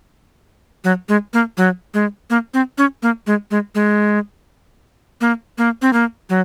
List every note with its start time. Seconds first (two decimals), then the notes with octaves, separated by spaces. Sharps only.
0.84 F#3
1.09 G#3
1.33 A#3
1.57 F#3
1.94 G#3
2.30 A#3
2.54 C4
2.78 C#4
3.02 A#3
3.27 G#3
3.51 G#3
3.75 G#3
5.21 A#3
5.58 A#3
5.82 C4
5.93 A#3
6.29 F#3